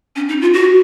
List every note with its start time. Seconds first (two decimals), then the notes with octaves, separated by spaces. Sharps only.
0.16 C#4
0.29 D#4
0.41 F4
0.54 F#4